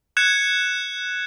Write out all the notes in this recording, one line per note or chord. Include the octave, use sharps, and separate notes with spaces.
F#6 G#6 C#7 E7